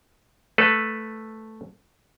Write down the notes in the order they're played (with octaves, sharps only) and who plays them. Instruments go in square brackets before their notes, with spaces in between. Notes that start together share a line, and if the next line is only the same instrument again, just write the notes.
[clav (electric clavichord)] A3 A4 B4